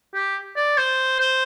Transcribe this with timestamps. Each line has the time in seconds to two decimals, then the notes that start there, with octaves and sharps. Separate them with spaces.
0.14 G4
0.56 D5
0.78 C5
1.20 C5